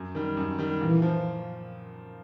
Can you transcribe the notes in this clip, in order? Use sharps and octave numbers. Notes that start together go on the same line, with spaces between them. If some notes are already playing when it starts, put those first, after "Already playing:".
Already playing: F#2
D#3 G3
F#2
D#3 G3
A#2 E3
F3